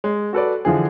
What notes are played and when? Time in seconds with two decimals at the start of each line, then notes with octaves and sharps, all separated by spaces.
0.04 G#3
0.33 F#4 A4 B4 D5
0.65 D3 E3 F3 G#4